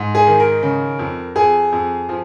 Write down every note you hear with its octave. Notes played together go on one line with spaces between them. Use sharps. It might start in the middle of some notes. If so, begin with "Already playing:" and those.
Already playing: G#2
G#4
D#3
A#4
C#3
F2
F2 G#4
F2
F3